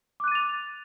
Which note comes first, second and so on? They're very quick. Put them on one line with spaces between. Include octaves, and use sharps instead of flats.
D6 F#6 D#7 A6 F7